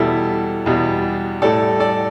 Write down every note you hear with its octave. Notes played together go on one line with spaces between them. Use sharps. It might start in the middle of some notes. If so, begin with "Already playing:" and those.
Already playing: E2 B2 G3 E4 A4
E2 B2 G3
A2 G3 A4 D5
A4 D5